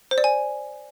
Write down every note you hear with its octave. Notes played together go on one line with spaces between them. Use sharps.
C5
D5
G#5